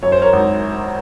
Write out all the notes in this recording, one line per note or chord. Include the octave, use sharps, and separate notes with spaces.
F#2 C#5
C5
A#4 C#5
G#1